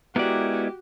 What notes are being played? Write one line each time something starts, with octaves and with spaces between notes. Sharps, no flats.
G#3 B3 E4 F#4 G4 A#4 D5